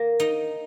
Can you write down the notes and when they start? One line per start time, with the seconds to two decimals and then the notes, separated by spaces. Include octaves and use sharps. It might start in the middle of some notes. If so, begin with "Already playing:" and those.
Already playing: A#3
0.20 D#4